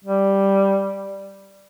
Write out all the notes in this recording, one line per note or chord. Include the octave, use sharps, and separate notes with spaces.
G3